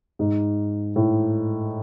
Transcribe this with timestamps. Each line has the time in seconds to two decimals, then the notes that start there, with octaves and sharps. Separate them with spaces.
0.19 G#2
0.96 A2